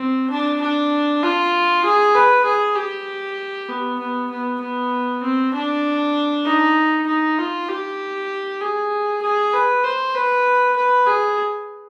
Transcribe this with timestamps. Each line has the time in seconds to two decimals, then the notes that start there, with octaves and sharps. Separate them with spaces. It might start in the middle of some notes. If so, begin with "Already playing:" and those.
Already playing: C4
0.30 D4
0.61 D4
1.23 F4
1.85 G#4
2.14 B4
2.45 G#4
2.76 G4
3.69 B3
3.99 B3
4.30 B3
4.61 B3
5.23 C4
5.54 D4
6.45 D#4
7.07 D#4
7.38 F4
7.69 G4
8.61 G#4
9.22 G#4
9.53 B4
9.84 C5
10.15 B4
10.76 B4
11.07 G#4